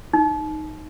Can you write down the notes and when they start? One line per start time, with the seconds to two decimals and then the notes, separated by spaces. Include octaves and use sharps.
0.13 D#4